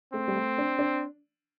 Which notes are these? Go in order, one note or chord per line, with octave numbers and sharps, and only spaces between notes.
A3 C4
G3
A3
D4
D4